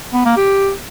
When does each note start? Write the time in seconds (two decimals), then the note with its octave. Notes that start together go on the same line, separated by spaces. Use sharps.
0.14 B3
0.25 A#3
0.37 G4